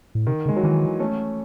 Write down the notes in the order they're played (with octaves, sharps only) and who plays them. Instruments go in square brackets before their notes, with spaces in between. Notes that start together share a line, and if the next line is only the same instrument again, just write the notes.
[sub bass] A2
[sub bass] C3 [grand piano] D#3
[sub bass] C#3
[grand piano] G#3
F#3
[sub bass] D#3 [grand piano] E3
[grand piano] A3 C#4